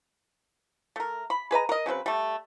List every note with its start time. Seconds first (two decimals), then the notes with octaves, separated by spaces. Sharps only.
0.96 A3 A#4
1.30 B5
1.51 G#4 B4 D#5 A#5
1.69 A#4 D#5
1.86 C#3 F#3 C4 B4
2.06 G3 A3